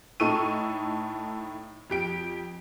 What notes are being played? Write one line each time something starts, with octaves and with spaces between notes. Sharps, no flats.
A2 D#4 A4 C#6 E6 D#7
F2 G4 D7